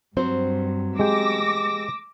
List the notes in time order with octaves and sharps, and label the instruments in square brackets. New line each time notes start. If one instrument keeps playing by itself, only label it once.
[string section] G2 [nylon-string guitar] F#3 C4 C5
[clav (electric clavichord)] G#3 G4 [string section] D6 E6 A#6